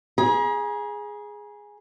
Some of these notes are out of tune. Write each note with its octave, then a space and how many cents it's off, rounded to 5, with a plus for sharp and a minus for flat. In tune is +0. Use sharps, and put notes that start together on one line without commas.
G#4 +0 A#5 +40